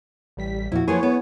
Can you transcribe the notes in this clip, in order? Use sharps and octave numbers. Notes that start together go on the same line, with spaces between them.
A1 G3 B6
E2 A#2 F3 E4 F#4
F3 A#3 G#4 B4 C#5
B3